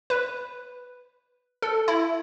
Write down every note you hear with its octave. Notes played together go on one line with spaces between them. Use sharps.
B4
A4
E4